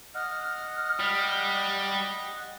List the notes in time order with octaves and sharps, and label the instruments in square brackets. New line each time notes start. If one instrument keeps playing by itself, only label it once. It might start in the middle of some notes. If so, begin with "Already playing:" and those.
[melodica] D#5 F#5 [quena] F6
[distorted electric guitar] G3